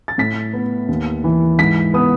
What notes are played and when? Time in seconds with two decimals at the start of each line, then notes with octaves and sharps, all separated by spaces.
0.08 A6
0.18 A2 B6
0.53 B3
0.88 D#2
1.24 E3
1.58 G#2 B6
1.94 B3 D#6